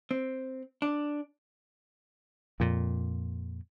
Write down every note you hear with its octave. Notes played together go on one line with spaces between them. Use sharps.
C4
D4
F2 A#2